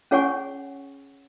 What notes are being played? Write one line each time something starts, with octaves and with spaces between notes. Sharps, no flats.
C#4 G#4 C#5 F#5 G#5 C#6